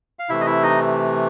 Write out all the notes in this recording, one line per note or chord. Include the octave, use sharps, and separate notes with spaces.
F5
C3 E3 A3 E4 E5
D#5
E4 E5
D#4 D#5